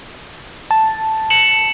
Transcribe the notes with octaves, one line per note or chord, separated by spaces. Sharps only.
A5
C#7 E7 F#7